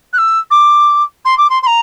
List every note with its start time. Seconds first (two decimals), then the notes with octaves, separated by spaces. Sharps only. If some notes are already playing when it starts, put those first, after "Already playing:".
0.13 F#6
0.18 E6
0.51 D6
1.25 C6
1.38 D6
1.50 C6
1.63 C6
1.67 A#5